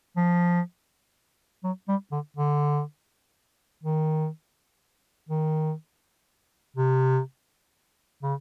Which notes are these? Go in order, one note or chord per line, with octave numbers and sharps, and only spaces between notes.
F3
F#3
G3
D3
D3
D#3
D#3
C3
C#3